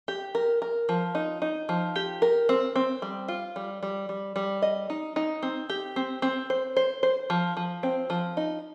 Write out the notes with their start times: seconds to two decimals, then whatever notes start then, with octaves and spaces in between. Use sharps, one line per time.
0.08 G4
0.35 A#4
0.62 A#4
0.89 F3
1.15 D#4
1.42 D#4
1.69 F3
1.96 G4
2.22 A#4
2.49 C4
2.76 C4
3.02 G3
3.28 F4
3.56 G3
3.83 G3
4.09 G3
4.36 G3
4.62 D#5
4.90 D#4
5.16 D#4
5.43 C4
5.70 G4
5.96 C4
6.22 C4
6.50 C5
6.77 C5
7.03 C5
7.30 F3
7.57 F3
7.83 C4
8.10 F3
8.37 D#4